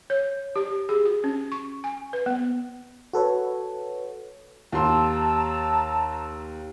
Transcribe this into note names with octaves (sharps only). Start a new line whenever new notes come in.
C#5
G4
G#4
F#4
C#4
C#6
G#5
B4
B3
F#4 A4 B4 C#5
D#2 A5 A#5 C6 E6